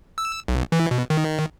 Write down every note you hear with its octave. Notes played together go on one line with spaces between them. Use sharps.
E6
B1
E3
B2
D#3